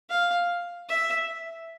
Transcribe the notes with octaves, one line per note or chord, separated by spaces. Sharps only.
F5
E5